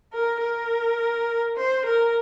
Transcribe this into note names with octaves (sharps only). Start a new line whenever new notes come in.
A#4
A#4
C5
A#4